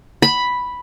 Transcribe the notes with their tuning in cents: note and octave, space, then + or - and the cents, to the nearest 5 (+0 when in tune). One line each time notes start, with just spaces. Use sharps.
B5 +0